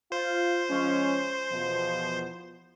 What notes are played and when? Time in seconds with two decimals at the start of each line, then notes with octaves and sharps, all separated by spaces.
0.12 F4 C5
0.69 F3 G#3 C#4
1.51 E2 B2 F3